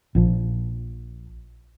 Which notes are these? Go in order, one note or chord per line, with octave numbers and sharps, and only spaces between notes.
A#1 A#2 F3